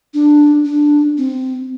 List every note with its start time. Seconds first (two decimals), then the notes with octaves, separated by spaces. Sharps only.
0.14 D4
0.65 D4
1.18 C4